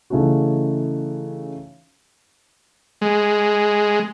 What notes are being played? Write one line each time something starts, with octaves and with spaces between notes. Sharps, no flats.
C#3 E3 A3 C#4 D#4 F#4
G#3